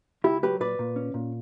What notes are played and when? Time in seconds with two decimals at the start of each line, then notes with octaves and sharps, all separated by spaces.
0.24 C#2 E4 G4
0.43 F#3 G4 B4
0.60 A#2 B4 D5
0.79 A#2
0.96 C#4
1.14 A#2